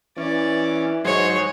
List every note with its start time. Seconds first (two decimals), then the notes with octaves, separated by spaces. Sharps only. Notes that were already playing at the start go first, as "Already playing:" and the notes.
0.18 E3 C#4 D5
1.05 G#2 F#3 G#4 C5 C#5